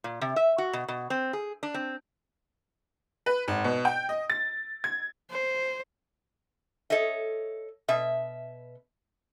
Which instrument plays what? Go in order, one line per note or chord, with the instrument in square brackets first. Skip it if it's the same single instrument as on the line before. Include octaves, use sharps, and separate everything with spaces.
[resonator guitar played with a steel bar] A#2
C3
E5
F#4
B2
B2
C4
G#4
D4
C4
[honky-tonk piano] B4
G#1
B2
G5
D#5
A6
G#6
[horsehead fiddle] C5
[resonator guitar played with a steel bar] A4 C#5 D#5 E5
B2 E5